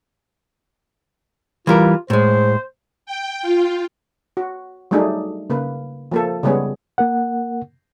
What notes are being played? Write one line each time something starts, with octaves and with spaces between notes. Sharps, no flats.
E3 G3 F4 A#4
A2 G#3 C5
G5
F4
F#4
F#3 G3 A3 D4 D#4 G#4
C#3 A#3 B4
F3 A#3 A4
C#3 G3 G#3 B3 G#4 C#5
A#3 A#4 F#5